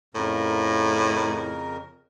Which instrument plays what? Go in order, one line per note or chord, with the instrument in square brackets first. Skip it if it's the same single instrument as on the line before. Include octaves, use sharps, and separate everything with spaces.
[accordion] F2 C#3 A#4 [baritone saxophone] A2